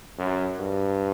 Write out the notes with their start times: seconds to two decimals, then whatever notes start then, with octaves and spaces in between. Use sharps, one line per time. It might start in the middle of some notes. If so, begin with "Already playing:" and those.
0.18 F#2
0.59 G2